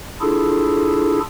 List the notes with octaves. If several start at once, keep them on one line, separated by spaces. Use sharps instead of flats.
D4 E4 F4 G#4 A4